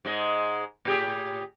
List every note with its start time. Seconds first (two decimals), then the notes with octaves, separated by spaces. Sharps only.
0.05 G#2 G#3 D#5
0.85 A2 G4 G#4